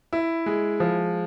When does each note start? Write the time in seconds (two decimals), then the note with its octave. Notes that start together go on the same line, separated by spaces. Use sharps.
0.13 E4
0.46 G#3
0.80 F3